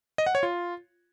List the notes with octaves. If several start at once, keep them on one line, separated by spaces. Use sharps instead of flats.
D#5
F#5
C#5
F4